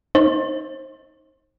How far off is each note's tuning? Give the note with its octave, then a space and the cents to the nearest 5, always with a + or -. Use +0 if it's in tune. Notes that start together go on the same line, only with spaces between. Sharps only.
D#4 +0 C5 +35